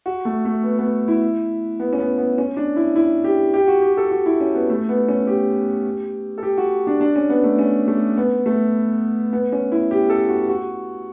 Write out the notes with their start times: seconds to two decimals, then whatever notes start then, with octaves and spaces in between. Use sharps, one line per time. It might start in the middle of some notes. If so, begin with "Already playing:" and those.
0.06 F#4
0.25 A3
0.45 A3
0.63 B3
0.79 B3
1.08 E4
1.80 B3
1.93 C#4
1.99 B3
2.18 B3
2.38 C#4
2.57 D4
2.76 E4
2.96 E4
3.24 G4
3.54 G4
3.68 F#4
3.82 G4
3.97 A4
4.11 F#4
4.26 E4
4.40 C#4
4.55 B3
4.70 A3
4.89 B3
5.08 C#4
5.27 G4
6.38 A4
6.43 G4
6.58 F#4
6.87 D4
7.01 D4
7.16 C#4
7.30 B3
7.44 A3
7.59 C#4
7.88 A3
8.17 B3
8.46 A3
9.33 B3
9.52 C#4
9.72 E4
9.91 G4
10.10 A4
10.29 F#4
10.49 F#4